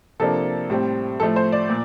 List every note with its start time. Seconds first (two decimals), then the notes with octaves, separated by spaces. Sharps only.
0.20 C3 F3 A#3 D4 A4
0.70 A2 G3 C4
1.20 A2 F3 A3 A4
1.36 C5
1.52 D5
1.70 A#2